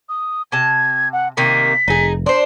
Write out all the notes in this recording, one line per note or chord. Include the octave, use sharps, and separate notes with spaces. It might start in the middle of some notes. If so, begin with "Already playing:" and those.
D#6
C3 A5 G#6
F#5
C3 D#3 A#3 B6
F1 D#4 G#4
D4 C5 C6